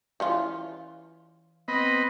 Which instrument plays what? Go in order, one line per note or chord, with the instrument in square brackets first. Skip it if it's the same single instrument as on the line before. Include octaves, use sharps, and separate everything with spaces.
[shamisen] E3 C#4 F4
[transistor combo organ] B3 C4 B5 [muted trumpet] D#5